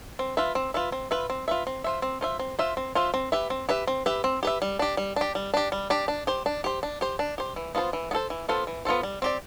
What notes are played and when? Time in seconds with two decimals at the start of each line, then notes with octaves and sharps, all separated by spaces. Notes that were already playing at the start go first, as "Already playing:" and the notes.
0.19 C4
0.37 F4 B4 E5
0.55 C4
0.74 F4 B4 E5
0.92 C4
1.11 F4 B4 E5
1.30 C4
1.48 F4 B4 E5
1.67 C4
1.84 F4 C5 E5
2.02 C4
2.21 F4 C5 E5
2.39 C4
2.59 F4 C5 E5
2.77 C4
2.95 F4 C5 E5
3.14 C4
3.32 G4 B4 E5
3.50 C4
3.69 G4 B4 E5
3.87 C4
4.06 G4 B4 E5
4.24 C4
4.43 G4 B4 E5
4.62 G3
4.79 D4 G4
4.97 G3
5.16 D4 G4
5.35 G3
5.54 D4 G4
5.72 G3
5.90 D4 G4
6.08 D4
6.27 G4 C5
6.46 D4
6.64 G4 C5
6.83 D4
7.01 G4 C5
7.19 D4
7.38 G4 C5
7.56 E3
7.75 B3 F4 A4 C5
7.93 E3
8.11 B3 F4 A4 C5
8.30 E3
8.49 B3 F4 A4 C5
8.67 E3
8.85 B3 F4 A4 C5
9.03 G3
9.22 C4 G4 D5